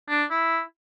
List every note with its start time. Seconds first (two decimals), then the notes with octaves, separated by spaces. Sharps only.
0.09 D4
0.31 E4